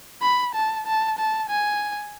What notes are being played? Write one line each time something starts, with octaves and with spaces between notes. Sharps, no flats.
B5
A5
A5
A5
G#5